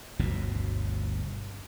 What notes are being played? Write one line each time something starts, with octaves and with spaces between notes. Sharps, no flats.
G1 D2 B2